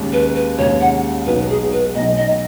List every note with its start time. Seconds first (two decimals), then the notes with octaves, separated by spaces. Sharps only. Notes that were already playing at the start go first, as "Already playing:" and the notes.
Already playing: D#2 C#3 G#3
0.13 B4
0.36 B4
0.58 D#2 C#3 G#3 C#5
0.81 F#5
1.26 B1 B2 F#3 D#4 B4
1.49 G#4
1.72 B4
1.95 B1 B2 F#3 D#4 D#5
2.17 D#5